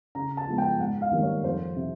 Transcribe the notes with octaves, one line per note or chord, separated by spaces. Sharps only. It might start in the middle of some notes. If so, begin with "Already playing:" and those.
C#3 A#5
A5
F3 G#3 B3
G5
G#2 F#5
F5
D#3 G3 A#3
C#5
F2 C5
C3